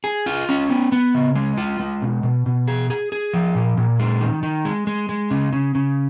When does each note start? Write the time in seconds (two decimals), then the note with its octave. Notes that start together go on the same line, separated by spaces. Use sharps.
0.04 G#4
0.26 F4
0.49 C#4
0.70 B3
0.92 B3
1.14 C#3
1.35 G#3
1.57 F4
1.80 G#3
2.02 B2
2.23 B2
2.46 B2
2.68 G#4
2.90 G#4
3.12 G#4
3.34 F3
3.55 A#2
3.77 A#2
3.99 G#3
4.21 D#3
4.43 D#3
4.65 G#3
4.87 G#3
5.09 G#3
5.31 C#3
5.53 C#3
5.75 C#3